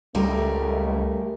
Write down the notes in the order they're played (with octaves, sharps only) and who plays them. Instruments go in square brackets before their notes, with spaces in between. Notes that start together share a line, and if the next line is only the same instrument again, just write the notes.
[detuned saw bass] C#2 [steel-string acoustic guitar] G3 A#4 [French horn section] A3